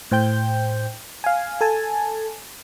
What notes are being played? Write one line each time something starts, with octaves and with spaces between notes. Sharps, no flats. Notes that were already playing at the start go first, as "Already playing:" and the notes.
A2 C5 G5 G6
F5 G#5
A4 G#5 A5